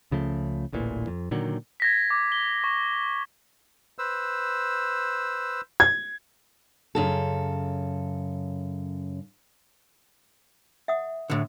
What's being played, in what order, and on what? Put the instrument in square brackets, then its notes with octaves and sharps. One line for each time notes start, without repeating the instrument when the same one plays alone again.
[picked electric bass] C#2 C#3 F3 A3
D1 A1 A#2 E3
F2
A#2 D3 D#3 F#3
[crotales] G#6 A#6 B6
D6
G7
C#6
[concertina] B4 C5 E6
[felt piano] G#6
[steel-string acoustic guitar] F#2 C#3 A4
[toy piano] E5 F#5 D#6
[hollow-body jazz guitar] A2 D3